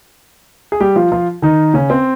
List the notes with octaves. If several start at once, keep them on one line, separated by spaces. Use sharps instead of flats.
G#4
G3 G4
F3 F4
F3 F4
D#3 D#4
C#3 C#4
C4